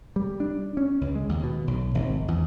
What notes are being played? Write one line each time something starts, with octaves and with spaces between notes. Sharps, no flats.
G3
D4
C#4
C#2
G#3
D#2
B2
B1
G#1
E2